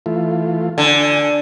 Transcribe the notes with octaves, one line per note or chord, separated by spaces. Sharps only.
E3 A3 F4
D3 G#5